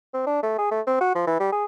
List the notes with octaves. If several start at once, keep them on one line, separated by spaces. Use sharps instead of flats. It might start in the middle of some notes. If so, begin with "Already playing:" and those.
C4
D4
A3
G#4
A3
C4
F#4
F3
E3
G3
G#4